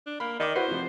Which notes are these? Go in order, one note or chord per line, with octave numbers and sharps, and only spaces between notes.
D4
A#3 B5
D#3 D5 D#5 D6
E4 F#4 B4 C5
C3 F3